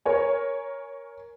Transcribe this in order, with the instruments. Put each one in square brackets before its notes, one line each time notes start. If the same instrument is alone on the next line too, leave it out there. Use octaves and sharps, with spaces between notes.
[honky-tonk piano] A#4 C#5 G#5